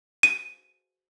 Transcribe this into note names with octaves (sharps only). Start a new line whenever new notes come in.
D#7